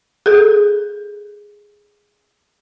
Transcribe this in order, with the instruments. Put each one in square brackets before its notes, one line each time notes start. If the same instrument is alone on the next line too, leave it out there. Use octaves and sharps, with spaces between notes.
[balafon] G#4 A4